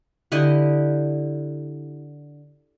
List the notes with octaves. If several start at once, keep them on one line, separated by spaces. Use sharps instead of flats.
D3 E4 G4 D#5